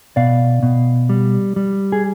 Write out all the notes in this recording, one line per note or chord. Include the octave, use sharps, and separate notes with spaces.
B2 D5 F5
B2
G3
G3
G#4